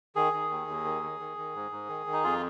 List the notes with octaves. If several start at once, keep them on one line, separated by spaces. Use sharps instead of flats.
D#3 G#4
D#3
D#2
D#2
D#3
D#3
D#3
D#3
G#2
G#2
D#3
D#3
D#4
F2 F4